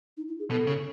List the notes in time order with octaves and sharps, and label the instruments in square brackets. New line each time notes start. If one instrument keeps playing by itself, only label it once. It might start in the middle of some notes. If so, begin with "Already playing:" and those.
[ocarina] D#4
E4
G#4
[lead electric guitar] B2 [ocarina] A4
[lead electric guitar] C#3